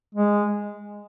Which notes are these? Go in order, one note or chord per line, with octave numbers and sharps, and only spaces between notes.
G#3